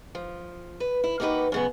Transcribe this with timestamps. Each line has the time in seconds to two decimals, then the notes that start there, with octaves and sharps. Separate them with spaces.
0.15 F3
0.80 B4
1.04 E4
1.20 A#3 B3 D#4 F#4 G4 B4
1.52 F#2 C#3 B3